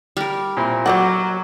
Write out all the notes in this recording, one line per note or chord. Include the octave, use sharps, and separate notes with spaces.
G3 A#4
A#2 C4 E4
F#3 A#4 C5 D5 D#5 F#5